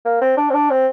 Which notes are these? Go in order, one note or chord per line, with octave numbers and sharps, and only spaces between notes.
A#3
C4
D4
C4
D4
C4